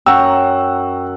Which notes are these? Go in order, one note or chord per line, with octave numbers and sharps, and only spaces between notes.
F#2 F#5 G5 A#5 C#6 E6